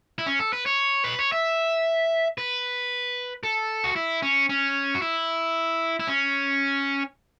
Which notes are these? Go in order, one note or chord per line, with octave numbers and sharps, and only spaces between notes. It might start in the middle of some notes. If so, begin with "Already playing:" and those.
E4
C#4
A4
B4
C#5
B4
C#5
E5
B4
A4
F#4
E4
C#4
C#4
F#4
E4
E4
C#4